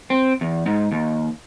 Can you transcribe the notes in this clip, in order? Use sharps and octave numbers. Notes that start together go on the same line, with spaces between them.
C4
E2
G#2
D#2